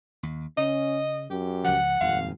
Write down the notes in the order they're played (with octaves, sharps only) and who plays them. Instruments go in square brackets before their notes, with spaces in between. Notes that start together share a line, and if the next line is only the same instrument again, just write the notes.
[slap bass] D#2
[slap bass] C#3 [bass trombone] C#4 [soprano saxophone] D#5
[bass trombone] F#2 [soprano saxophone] G4
[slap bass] C#2 F3 [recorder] F#5
[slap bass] D#1 F2 A#2 [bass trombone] G#1 [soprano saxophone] F5